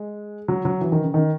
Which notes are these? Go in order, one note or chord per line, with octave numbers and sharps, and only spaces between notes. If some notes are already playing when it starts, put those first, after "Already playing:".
Already playing: G#3
F#3
F#3
E3
D#3
C#3
D#3